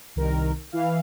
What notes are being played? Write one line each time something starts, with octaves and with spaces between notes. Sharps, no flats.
C2 D#3 A#4
E3 F5